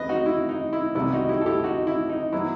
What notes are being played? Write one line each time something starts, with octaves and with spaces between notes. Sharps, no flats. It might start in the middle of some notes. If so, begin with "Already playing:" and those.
Already playing: E2 C4 B4 D#5
D#4 F#4
E4
D#4
E4
C2 C3 E3 G3 B3 E4
D#4 F#4
E4 G4
A4
E4 G4
D#4 F#4
E4
D#4
F#3 B3 E4